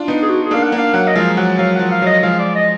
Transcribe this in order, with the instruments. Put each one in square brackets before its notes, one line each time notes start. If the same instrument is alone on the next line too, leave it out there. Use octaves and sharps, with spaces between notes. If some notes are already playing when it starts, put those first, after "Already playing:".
Already playing: [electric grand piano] D4 F4
B3 D#4
[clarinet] G#4
F#4
G#4
[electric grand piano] A#3 D4 [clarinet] F5
[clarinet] F#5
[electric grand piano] A#3 D4
[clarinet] F5
[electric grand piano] F#3 A#3 [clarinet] F#5
[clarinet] D#5
[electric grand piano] F3 G#3 [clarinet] F5
[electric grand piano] F#3 [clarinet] F#5
[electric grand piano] F#3 [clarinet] F5
[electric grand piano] F3 [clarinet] F#5
[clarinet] F5
[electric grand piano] F#3 [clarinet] D#5
[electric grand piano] F3 G#3 [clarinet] F5
[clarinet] D5
D#5